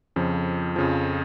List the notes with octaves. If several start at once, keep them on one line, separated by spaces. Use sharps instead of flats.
F2 C#3 F3
F2 C#3 F3